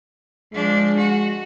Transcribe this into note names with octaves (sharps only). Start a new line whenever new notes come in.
F3 G#3 D4
F#4